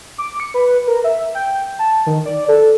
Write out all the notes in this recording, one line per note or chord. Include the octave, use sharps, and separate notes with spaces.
D6
C#7
B4
A#4
E5
G5
A5
D#3
D5
A4